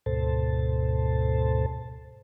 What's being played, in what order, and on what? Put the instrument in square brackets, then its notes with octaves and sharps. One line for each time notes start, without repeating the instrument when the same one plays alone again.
[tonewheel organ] D2 G#2 B2 A4 C5 A5